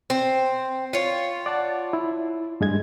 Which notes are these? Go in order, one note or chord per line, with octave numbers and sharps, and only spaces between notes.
C4
F4 C#5
D5 F#5 A5
E4
G2 G#3 G#6